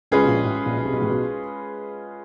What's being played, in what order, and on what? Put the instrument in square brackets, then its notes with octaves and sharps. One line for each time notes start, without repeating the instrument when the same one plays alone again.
[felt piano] C#2 C#3 [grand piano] G#3 C#4 F4 G#4 B4
[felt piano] B2
A#1 A#2
A1 A2
A#1 A#2
B1 B2
C2 C3
B1 B2
A1 A2
B1 B2